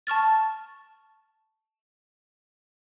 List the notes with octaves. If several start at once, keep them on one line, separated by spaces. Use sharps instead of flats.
A5 C#6 F6 A6